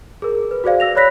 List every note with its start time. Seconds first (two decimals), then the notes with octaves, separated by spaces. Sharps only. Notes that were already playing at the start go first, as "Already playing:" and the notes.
0.22 G#4 A#4
0.51 B4
0.64 F#4 G#4 C5 D5 F5
0.80 E6 A#6 F7
0.95 C#5 D5 B5 F#6 A#6 B6